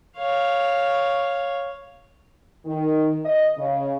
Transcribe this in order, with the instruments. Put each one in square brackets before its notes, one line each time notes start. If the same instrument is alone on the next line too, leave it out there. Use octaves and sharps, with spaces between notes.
[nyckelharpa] C#5 F5
[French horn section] D#3
D#5
C#3